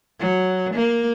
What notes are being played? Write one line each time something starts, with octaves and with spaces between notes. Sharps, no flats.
F#3
A#3